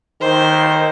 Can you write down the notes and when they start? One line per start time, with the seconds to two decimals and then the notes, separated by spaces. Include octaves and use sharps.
0.21 D#3 C5